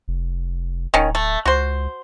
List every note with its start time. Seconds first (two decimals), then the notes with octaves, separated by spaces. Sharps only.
0.08 F1
0.94 D1 D#3 C#4
1.15 A3
1.45 C#2 F#4 C5